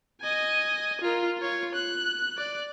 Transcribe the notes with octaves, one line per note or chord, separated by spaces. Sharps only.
D#5 G#5
F4 A#4
F4 C#5
F#6
D5